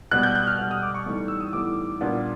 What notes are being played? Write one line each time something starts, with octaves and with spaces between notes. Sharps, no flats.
B2 G3 B3 F#6
G6
F#6
F6
B2 G3 B3
D#6
D6
C#6
A2 E3 G3 B3 D#4
E6
D#6
A2 E3 G3 B3 D#4 D6
A#2 G3 B3 D4